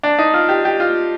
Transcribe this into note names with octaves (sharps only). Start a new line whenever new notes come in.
D4
D#4
F4
G4
G4
F4